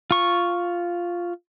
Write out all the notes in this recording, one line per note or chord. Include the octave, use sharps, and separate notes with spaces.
F4 C#6